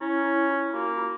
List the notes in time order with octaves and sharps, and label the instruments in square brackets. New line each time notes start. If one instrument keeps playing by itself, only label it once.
[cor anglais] C#4 [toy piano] E4
[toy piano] E4
F4
[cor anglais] A#3 [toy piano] F#4
[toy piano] F4